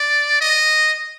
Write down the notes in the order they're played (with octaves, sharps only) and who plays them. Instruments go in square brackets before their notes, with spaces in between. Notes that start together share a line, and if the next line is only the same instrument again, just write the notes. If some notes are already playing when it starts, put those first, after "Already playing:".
Already playing: [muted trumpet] D5
D#5